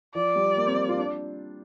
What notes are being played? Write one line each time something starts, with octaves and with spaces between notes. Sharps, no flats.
F3 D5
G3
A#3
C4
A#3
F4
D4